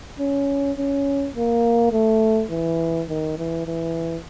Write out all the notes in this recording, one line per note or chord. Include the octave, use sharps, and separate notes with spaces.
C#4
C#4
A#3
A3
E3
D#3
E3
E3